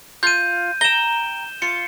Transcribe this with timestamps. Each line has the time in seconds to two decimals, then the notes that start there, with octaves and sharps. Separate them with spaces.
0.23 F4 G6 D#7
0.81 G5 A#5 E7 G7
1.62 F4 C#7